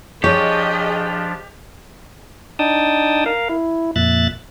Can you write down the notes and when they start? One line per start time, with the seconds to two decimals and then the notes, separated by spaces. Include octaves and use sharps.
0.24 F3 D4 G4 G#4 C#5 D#5 G5
2.59 D4 D#4 G5 A5 D#6
3.26 A#4 F5
3.49 E4
3.96 F2 A#2 E5 F#6 A6